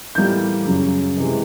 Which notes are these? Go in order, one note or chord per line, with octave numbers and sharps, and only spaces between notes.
A2 E3 G3 A#3 G6
F#2 C#3 F#3
C3 E3 G#3